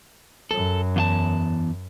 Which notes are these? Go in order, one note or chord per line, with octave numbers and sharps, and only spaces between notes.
F#2 A4
E2 F4 A5